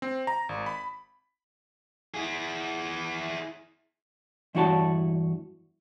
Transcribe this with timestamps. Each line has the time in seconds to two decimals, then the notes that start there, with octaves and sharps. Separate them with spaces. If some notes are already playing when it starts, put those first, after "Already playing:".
0.02 C4
0.27 A#5
0.49 G#1
0.66 B5
2.14 E4 G#4
4.55 E2 G2 E4 F#4 C#5 A5